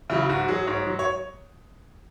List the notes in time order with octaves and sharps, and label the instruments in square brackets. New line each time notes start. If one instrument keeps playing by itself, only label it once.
[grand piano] C#3 F#3 E4
G#2 F#4
F#3 G#4
G#2 C#5
F#3
C#5